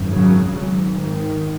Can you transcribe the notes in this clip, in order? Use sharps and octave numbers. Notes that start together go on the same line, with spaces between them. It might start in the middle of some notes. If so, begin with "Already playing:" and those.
Already playing: G#1 F#2
C#3 F#3
G#1 G#2
D#3